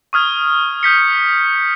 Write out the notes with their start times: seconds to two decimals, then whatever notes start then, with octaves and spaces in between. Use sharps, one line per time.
0.13 C#6 D#6 F6 G#6
0.83 D#6 G6 B6 C#7